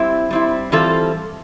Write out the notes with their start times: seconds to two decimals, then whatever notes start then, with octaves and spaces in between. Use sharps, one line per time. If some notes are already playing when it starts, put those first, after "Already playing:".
Already playing: G3 C4 E4
0.31 G3 C4 E4
0.72 E3 G3 C4 F4 A4